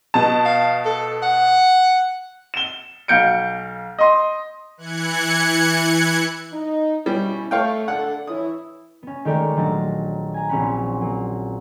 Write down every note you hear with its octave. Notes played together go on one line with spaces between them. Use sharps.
B2 A5
F5
A4
F#5
E7 G7
B1 F5 G6 C#7 D7
D#5 C6
E3 F#6 G#6 C#7
D#4
B2 G3 C#4 E4
A3 C#5 F5 G5
D3 D4 A4 F#5
E3 E4 C#5 D#6
B3 C#4
D#3 G#3 A3 G4 A#4 D5
A#1 D#3 F#3 D4 A5 A#6
G#5 A#5
A#1 C4 C#4 F#5 B5
F#3 A#3